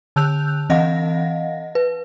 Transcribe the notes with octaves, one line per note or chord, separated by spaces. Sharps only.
D3 A5 E6 F#6 G6 F7
E3 C4 D#5 F5 F#5 A#6
B4